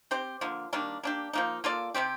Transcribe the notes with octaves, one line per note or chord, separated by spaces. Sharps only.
C4 G4 C5
D3 F3 A#3
D#3 G3 A#3 D4
A#3 D4 G4
F3 A#3 D#4
A#3 F4 A4 D5
C3 G3 C4 G4